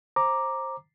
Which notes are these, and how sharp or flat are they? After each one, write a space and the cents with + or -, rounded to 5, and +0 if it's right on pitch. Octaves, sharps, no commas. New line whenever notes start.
C5 +25 A#5 +0 D6 +0